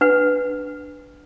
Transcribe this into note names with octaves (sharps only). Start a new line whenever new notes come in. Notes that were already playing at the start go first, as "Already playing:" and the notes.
D4 B4 F#5